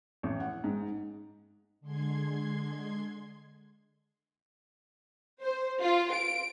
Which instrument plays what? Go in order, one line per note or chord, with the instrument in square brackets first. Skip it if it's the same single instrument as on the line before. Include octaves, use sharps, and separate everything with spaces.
[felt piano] A1
F#5
G#2
[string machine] D3 G#3 C6 G#6
[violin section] C5
F4
D7